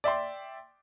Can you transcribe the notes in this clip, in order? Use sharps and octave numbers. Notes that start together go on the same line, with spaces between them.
D5 E5 G5 C6